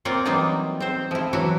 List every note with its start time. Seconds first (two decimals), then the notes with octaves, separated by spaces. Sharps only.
0.05 A#3 C4 F4 C#5 D5
0.25 E3 F#3 G3 A#3 D#4 F4
0.80 C4 C5
1.11 F3 E4
1.33 E3 F#3 E4 F#4